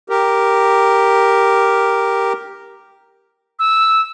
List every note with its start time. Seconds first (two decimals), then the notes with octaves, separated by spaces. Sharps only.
0.09 G4 A#4
3.59 E6